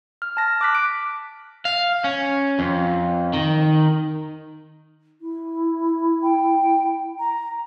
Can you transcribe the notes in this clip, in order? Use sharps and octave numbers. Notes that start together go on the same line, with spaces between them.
F6
A5 A#6
D6 F#6 B6
D7
F5
C#4
F2
D#3
E4
G5
A#5